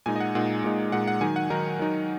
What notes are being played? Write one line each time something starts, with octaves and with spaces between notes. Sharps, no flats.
A#2 G#3 D#4 G#5
D#5
F#5
A#2 G#3 D#4 F#5
A#2 G#3 D#4
A#2 G#3 D#4 F#5
F#5
D#3 F#3 D#4 G#5
F#5
D#3 F#3 D#4 A#4
D#3 F#3 D#4